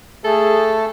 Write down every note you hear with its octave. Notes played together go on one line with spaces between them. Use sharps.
A3 G#4 A4